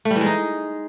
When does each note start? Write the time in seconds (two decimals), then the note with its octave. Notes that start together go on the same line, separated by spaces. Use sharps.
0.05 A3
0.10 G3
0.16 E3
0.21 G#3
0.26 D#4